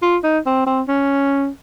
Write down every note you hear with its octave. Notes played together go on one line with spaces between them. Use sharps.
F4
D#4
C4
C4
C#4